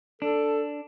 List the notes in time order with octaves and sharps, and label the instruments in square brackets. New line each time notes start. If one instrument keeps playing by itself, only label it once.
[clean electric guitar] D4 [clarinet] A4